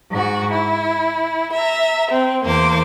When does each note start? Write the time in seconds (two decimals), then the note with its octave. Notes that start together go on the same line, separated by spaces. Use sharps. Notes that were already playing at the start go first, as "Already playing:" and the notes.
0.10 G#2 F#4
0.51 E4
1.53 E5 A#5
2.09 C4
2.43 E2 A#3 C5 D6